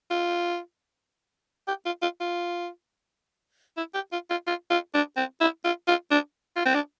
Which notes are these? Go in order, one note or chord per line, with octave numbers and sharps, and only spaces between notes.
F4
G4
F4
F4
F4
E4
G4
F4
F4
F4
F4
D4
C4
E4
F4
F4
D4
F4
C4
D4